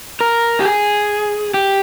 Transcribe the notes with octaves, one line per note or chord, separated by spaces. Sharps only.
A#4
G4
G#4
G4